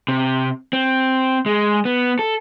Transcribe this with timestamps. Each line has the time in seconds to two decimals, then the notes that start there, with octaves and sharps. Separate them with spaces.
0.08 C3
0.73 C4
1.46 G#3
1.85 B3
2.19 A4